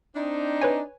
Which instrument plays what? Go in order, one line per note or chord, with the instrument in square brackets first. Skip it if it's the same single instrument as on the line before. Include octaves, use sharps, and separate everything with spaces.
[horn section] C4 D4 D#4
[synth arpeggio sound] B4 C#5 G#5